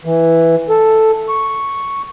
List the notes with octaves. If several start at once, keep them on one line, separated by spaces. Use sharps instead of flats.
E3
A4
C#6